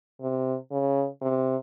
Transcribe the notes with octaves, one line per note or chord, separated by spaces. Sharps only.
C3
C#3
C3